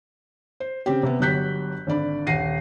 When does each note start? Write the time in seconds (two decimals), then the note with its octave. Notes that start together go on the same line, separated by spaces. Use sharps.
0.60 C5
0.86 C#3 C4 G4
1.03 C3 B3
1.20 G1 F#3 G4 F#6 G6 B6
1.87 G#1 D3 D5 B5
2.27 D#1 F#5 A#6 C7 D#7